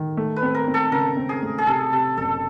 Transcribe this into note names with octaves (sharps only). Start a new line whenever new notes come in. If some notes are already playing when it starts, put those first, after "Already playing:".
Already playing: D#3
A3
B4
C4
A#4
C4
A4
C#3 A#4
C4
G#4
A3
G#4
C3 A4
C3 A4
F#1 A4